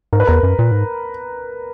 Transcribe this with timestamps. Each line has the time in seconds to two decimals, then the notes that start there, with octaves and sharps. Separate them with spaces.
0.13 G#2 A#4
0.20 B4
0.27 E2 A#4
0.43 F#2
0.59 A#2
0.72 G#2